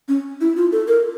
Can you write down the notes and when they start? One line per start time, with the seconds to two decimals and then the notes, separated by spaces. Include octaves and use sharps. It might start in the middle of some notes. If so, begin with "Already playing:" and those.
0.08 C#4
0.41 E4
0.56 F4
0.72 A4
0.88 A#4